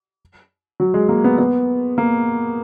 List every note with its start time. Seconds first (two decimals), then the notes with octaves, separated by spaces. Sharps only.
0.80 F#3
0.94 G#3
1.09 A#3
1.24 B3
1.39 B3
1.98 A#3